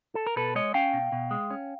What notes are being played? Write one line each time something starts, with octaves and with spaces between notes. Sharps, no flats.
A4
A#4
B2 A4 B4
G#3 C#5 D#5
C#4 F5 G5
B2
B2
G#3
C#4